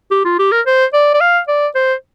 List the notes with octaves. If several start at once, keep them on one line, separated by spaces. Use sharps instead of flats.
G4
F4
G4
A#4
C5
D5
D5
F5
D5
C5